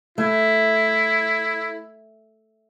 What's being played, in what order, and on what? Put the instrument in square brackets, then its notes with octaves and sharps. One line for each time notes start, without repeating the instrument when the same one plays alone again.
[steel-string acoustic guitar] A3 [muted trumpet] E4